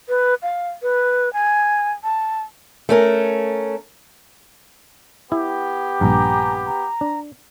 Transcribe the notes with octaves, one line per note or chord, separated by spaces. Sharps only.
B4
F5
B4
G#5
A5
A3 C#4 A#4
B3 E4 G4
A#1 G2 G#5 A#5
A#5
D4